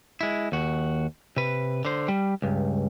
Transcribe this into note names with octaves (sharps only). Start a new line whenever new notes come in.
G#3 E4
D#2 F#4
C3 B4
D3 C5
G3
C#2 G2